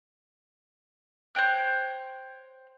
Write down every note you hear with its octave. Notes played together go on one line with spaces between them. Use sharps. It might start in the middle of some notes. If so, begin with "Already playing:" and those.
C5 C#5 G5 F#6